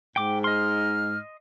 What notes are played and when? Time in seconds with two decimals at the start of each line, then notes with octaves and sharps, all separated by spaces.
0.16 G#2 G5 D6
0.44 D#5 C6 F6